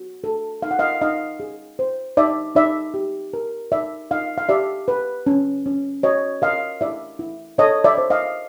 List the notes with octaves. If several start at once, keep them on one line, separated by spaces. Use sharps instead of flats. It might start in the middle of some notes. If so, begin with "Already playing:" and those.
Already playing: F#4
A4
D#4 F5
F#5
D#5 F5
D#4 D#5 F5
G#4
C5
D#4 D5 E5
D#4 D5 E5
G4
A#4
D#4 D5 E5
D#4 D#5 F5
F5
G4 D5 E5
B4
C#4
C#4
F#4 C#5 D#5
A#4 D#5 F5
E4 D5 E5
E4
A4 C#5 D#5
D5 E5
C5
D#5 F5